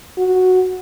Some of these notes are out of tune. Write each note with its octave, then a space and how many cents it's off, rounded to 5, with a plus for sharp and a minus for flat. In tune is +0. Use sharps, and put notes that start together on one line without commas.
F#4 -5